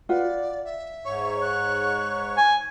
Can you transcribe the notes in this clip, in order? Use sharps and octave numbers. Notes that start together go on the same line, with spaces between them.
F4 B4 D5 F#5
E5
G#2 C#5 C#6
F#6
G#5